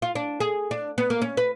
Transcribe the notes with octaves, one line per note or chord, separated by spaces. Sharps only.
F4
D4
G#4
D4
B3
A#3
C#4
B4